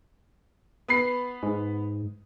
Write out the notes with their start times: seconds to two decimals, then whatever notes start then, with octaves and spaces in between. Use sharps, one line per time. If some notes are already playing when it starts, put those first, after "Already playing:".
0.88 B3 B5 C7
1.43 G#2